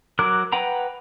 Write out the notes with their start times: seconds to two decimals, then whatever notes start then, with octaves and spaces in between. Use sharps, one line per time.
0.19 F#3 A#4 D6 F#6
0.53 B4 F#5 G5 A#5